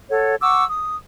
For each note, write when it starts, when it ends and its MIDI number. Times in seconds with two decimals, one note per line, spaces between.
0.10 0.35 69
0.10 0.35 73
0.10 0.35 78
0.42 0.65 78
0.42 0.65 85
0.42 0.65 86
0.42 0.65 88
0.68 0.96 87